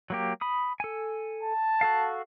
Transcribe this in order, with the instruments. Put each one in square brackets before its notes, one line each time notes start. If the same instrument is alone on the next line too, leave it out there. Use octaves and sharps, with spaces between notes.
[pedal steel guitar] F#3 A#3 G4
B5 D#6
A4 G#5
[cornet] A5
[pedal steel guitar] F#4 A4 F5